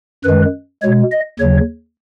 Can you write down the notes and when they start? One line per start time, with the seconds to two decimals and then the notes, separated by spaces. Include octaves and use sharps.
0.25 F#2 D#3 G#3 B4
0.83 B2 G#3 C#5
1.12 D#5
1.40 D#2 C#3 F#3 C#5